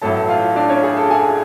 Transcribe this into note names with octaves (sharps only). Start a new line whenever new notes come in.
A1 A2 F#3 A4 A5
F4 F5
D4 D5
C#4 C#5
G#4
A4
G#4 G#5